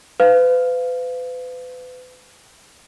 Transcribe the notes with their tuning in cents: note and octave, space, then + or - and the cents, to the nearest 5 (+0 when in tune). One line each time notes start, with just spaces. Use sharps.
B4 +35 F5 -5